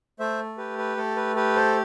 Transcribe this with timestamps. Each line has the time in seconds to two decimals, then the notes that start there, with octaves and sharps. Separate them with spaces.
0.19 A3 C5 E5
0.57 G4 B4
0.78 B4
0.97 A3 A4
1.16 B4
1.36 G4 B4
1.56 A4 C5